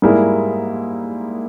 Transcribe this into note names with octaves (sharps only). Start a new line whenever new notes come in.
G#2 G3 A#3 E4 G#4